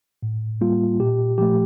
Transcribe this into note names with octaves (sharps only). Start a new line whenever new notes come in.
A2
G3 A#3 F4
A#2 G4
F3 A3 G4